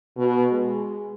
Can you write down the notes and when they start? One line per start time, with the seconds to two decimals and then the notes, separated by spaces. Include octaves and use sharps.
0.17 B2
0.52 G#3